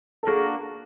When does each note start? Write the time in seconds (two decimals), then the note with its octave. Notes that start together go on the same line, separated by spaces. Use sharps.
0.23 A4
0.27 A#3 D4 F#4 G#4 A#4